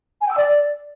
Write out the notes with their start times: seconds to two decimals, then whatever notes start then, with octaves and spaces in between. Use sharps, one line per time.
0.20 G#5
0.26 G5
0.32 E6
0.37 D5